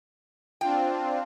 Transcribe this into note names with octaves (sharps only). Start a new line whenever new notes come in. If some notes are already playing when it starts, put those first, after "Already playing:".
C4 D4 F4 G5